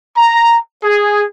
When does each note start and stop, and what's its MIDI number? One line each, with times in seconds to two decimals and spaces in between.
0.17 0.57 82
0.83 1.23 68